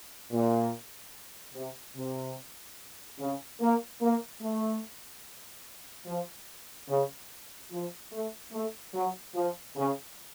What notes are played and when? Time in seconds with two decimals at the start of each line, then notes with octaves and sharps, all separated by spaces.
0.32 A#2
1.54 C3
1.96 C3
3.19 C#3
3.61 A#3
4.02 A#3
4.42 A3
6.06 F3
6.89 C#3
7.71 F3
8.13 A3
8.53 A3
8.94 F#3
9.35 F3
9.76 C#3